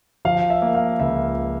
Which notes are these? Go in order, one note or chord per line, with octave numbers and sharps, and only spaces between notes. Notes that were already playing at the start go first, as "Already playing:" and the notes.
F3 F5
E5
A#3
F5
C#2 E5